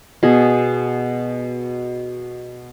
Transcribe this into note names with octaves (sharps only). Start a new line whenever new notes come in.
B2 G#4